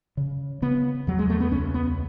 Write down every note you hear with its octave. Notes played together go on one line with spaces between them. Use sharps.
C#3
C#3 B3
E2 F#3
G#3
A3
B3
C#2 C#4
B3